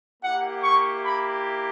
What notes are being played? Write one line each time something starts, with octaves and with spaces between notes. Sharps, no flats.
A#3 E4 G4 F#5
C#6
B5